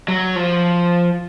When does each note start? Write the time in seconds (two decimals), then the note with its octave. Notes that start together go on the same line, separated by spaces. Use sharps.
0.08 F#3
0.36 F3